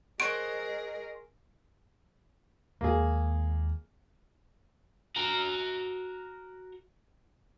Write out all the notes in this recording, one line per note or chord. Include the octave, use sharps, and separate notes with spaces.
G#4 A#4 C5 C#5 D#5 F#5 D7
D#2 G#3 A#3 G#4
F#4 A#4